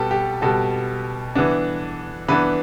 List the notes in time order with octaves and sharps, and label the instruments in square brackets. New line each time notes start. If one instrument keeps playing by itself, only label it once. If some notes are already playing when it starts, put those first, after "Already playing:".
Already playing: [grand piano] B2 G3 B3 G4 A4
G4
B2 G3 B3 A4
E3 B3 D4
E3 B3 D4 B4